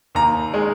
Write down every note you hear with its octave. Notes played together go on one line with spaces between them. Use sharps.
D#2 A#5
G#3